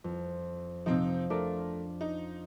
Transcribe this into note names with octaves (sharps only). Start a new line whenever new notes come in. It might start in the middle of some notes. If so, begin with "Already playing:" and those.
F2
C3 F3 C4 D#4
A3 D4 F4 A#4 D5
D#4